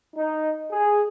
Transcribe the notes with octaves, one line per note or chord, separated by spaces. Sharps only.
D#4
G#4